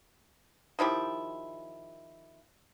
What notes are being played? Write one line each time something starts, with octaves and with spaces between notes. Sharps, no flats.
D#3 F3 E4 G4